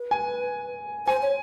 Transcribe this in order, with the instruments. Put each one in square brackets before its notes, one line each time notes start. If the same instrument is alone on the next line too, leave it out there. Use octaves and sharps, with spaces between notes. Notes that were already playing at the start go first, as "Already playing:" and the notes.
Already playing: [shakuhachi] B4
[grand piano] G#5
[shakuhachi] C5 [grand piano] G#5
[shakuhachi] C#5